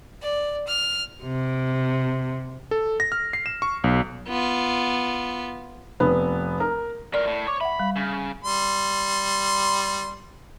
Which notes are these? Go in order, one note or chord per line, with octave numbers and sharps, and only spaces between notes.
D5
F6
C3
A4
A#6
F6
C7
E7
C#6
B1
B3 F4
F1 B3
A#4
A2 A#4 D5
A2
C#5 D6
E5 F#5 B5
G3
C#3
G3 C6